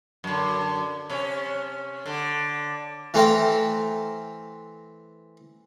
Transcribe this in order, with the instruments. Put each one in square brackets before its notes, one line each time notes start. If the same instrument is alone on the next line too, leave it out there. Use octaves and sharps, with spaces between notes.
[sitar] F#2 D3
C3 C#4
D3
[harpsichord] E3 A3 C4 F5 G5 A#5